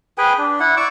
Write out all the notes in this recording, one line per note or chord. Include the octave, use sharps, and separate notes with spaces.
G#4 B4 G5 G#5
D4
E4 F#5
D5 C#6 D6 E6